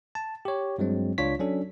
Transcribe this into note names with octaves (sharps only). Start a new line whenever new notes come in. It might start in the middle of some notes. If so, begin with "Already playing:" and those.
A5
G4 C#5
G2 F#3 G#3 C4
C#2 D4 F4 C#5 B6
F#3 C#4 D4 A4